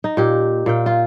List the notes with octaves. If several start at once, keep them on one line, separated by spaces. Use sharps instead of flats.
D#4
A#2 G4
A#2 F5 G5
F4